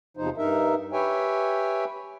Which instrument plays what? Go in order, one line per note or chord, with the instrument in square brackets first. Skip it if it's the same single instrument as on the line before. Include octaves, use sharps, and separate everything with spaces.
[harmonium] E2 C3 F3 D#4 C5
G2 D#4 A#4 E5
G4 B4 C#5 E5 G5 G#5